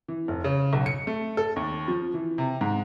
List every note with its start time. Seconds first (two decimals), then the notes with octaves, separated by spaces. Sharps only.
0.08 E3
0.28 F1
0.44 C#3
0.73 B1
0.86 C#7
1.07 A3
1.37 A4
1.56 D#2
1.88 F3
2.14 E3
2.38 C3
2.61 G#2